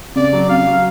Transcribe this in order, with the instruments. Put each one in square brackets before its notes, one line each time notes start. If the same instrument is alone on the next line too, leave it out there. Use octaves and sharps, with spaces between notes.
[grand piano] C#3 [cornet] D5
[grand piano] F#3
[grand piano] C#3 [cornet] F5
[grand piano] F#3